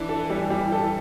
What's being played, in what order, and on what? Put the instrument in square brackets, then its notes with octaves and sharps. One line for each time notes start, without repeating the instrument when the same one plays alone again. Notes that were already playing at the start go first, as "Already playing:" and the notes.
Already playing: [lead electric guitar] E3 [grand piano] D4
[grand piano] A4
G3
G3
A4